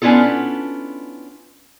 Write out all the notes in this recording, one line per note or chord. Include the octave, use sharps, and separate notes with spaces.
B3 C#4 D4 E4 F4 A4